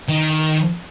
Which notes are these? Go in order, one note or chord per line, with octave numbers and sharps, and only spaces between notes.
D#3